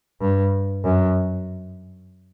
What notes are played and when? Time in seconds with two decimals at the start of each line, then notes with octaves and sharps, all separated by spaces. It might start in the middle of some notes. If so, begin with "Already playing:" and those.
0.21 G2
0.84 F#2